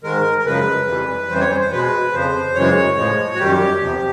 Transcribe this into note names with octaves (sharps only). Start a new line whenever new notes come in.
G#2 D#3 G#3 A#4
A#4
F#2 C#3 F3 G#3 B4
F2 C3 E3 G3
F2 C#3 E3 G3 C5
C#5
C5
C5
B2 G#3 B4
F2 C#3 F3 C5
F#2 C#3 E3 G#3 C#5
A2 F3 G#3
F#4
F#2 D#3 G3 G4
E2 C3 F3